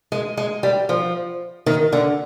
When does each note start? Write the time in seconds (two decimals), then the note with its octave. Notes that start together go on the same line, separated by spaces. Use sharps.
0.12 G#3
0.37 G#3
0.63 G3
0.89 F3
1.66 D#3
1.93 D3